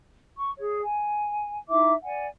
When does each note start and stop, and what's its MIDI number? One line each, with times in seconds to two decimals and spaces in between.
0.36 0.50 85
0.58 0.80 68
0.58 0.80 73
0.82 1.58 80
1.69 1.93 63
1.69 1.93 64
1.69 1.93 76
1.69 1.93 86
2.04 2.26 74
2.04 2.26 78
2.04 2.26 80